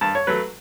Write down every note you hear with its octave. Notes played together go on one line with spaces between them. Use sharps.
G2 A5
C#5
F#3 A3 B4